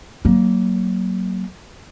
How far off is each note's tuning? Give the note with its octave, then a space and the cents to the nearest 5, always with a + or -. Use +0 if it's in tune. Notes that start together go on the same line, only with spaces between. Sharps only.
F#3 +25 A#3 +0